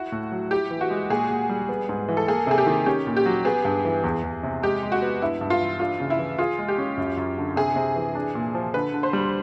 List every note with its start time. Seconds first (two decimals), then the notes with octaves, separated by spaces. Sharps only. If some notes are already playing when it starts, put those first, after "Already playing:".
Already playing: E4 F#4
0.12 A2
0.32 F#3
0.51 E4 G4
0.71 E3
0.81 F#4
0.90 G#3
1.10 A#2 G#4
1.30 A#2
1.49 G3
1.69 B3
1.89 G#2
2.08 E3
2.17 A4
2.28 A#3 G#4
2.47 C3 G#4
2.58 G4
2.67 D#3
2.86 C#4 G4
3.07 A#2
3.17 G4
3.26 F#3
3.45 B3 G#4
3.65 G2
3.85 E3
4.04 E2
4.23 E2
4.43 C3
4.62 G#3 G4
4.83 G#3
4.92 F#4
5.02 B3
5.22 G2 E4
5.41 G2
5.50 F4
5.61 E3
5.80 D4 F4
6.00 C#3
6.10 E4
6.19 E3
6.38 F4 G#4
6.59 G#3
6.68 G4
6.78 C#4
6.98 F#2
7.17 F#2
7.38 D3
7.56 C3 G#4
7.76 C3
7.96 E3
8.15 D4
8.35 A#2
8.55 F3
8.74 D3 B4
8.94 D3
9.03 C5
9.13 G3